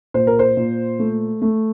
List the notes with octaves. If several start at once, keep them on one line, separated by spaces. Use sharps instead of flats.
A#2 C5
A#4
C5
A#2
A3
A3